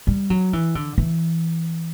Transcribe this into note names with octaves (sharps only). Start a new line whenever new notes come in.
G3
F#3
E3
D3
E3